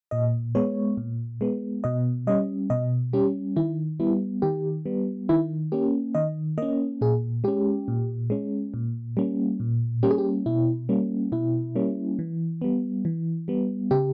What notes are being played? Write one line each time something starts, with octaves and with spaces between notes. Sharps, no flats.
A#2 D#5
G#3 B3 C#5
A#2
G#3 B3
B2 D#5
G3 C#4 D#5
B2 D#5
G3 C#4 G4
D#3 E4
G3 B3 E4
D#3 G4
G3 B3
D#3 E4
A#3 C#4 G4
D#3 D#5
A#3 C#4 D#5
A#2 G#4
G#3 C#4 G4
A#2
G#3 C#4
A#2
G3 A#3 C#4
A#2
G3 A#3 C#4 G4
G#4
G4
B2 E4
G3 A#3 C#4
B2 E4
G3 A#3 C#4
E3
G3 B3
E3
G3 B3
C#3 G4